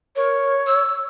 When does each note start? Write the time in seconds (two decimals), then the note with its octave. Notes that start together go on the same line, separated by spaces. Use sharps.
0.16 A#4 C#5
0.67 E6